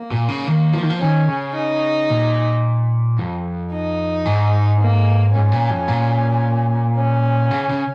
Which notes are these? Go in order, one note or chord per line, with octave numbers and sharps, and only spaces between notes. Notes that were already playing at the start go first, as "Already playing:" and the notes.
Already playing: A#3
A#2
C#3
D#3 A#3
F3
D#3
F3
D#3 C#4
C#3
D#4
A#2
F2
D#4
G#2
A#3
G#2 C#4
A#2
F2
A#2
C#4
C#3
C#3